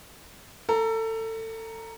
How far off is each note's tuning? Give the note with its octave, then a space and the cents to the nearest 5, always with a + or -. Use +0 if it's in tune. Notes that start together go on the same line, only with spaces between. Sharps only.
A4 +25 A#5 +0